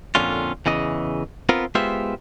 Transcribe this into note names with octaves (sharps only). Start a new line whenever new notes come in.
F2 A#2 D3 C#4 F4
E2 C#3 E3 D#5
B3 C4 F4 A#4
G#3 B3 F4 G4 C5 E5